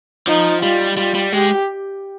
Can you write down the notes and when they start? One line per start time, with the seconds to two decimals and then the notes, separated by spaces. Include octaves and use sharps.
0.27 F3 D#4
0.62 G3 F4
0.97 G3 F4
1.15 G3
1.33 G#3 G4